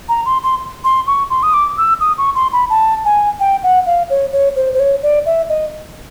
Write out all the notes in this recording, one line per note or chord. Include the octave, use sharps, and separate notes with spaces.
A#5
C6
C6
C6
C#6
C6
D#6
D6
E6
D#6
C#6
C6
B5
A5
G#5
G5
F#5
F5
C#5
C#5
C5
C5
C#5
D5
E5
D#5